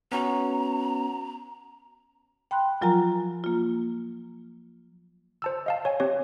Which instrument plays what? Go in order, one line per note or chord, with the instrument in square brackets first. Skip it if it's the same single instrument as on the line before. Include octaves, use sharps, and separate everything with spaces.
[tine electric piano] B3 C#4 F#4 [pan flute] A#5
[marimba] G5 B5 C6 F#6
F3 F#3 F4 A#4 G#5 A#5
A#3 F4
[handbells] C5 A5 E6
D#5 F5 A5
C#5 G#5
C4 G4 C#5